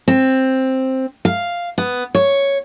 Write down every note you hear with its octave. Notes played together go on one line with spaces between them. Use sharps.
C4
F5
B3
C#5